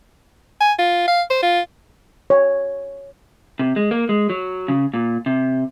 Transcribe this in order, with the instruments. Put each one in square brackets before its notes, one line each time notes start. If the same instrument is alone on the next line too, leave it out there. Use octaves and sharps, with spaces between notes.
[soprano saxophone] G#5
F4
F5
C5
F4
[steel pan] C#5
[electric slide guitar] C3
G#3
A#3
G#3
F#3
C#3
A#2
C3